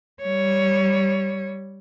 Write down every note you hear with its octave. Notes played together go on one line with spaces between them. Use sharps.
G3 C#5